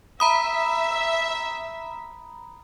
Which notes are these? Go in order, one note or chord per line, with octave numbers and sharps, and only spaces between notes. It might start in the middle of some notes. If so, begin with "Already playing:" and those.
E5 A#5 B5 D#6